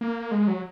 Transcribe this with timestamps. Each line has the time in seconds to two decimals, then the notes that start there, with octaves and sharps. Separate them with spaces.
0.01 A#3
0.31 G#3
0.48 F#3